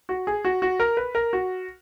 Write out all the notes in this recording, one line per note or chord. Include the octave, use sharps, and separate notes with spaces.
F#4
G#4
F#4
F#4
A#4
B4
A#4
F#4